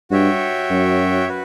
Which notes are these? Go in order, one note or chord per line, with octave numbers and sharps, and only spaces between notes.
G2 F#4 C#5 E5 G5
F#2
F#4 B4